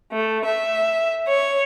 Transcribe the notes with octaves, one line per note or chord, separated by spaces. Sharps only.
A3
E5
C#5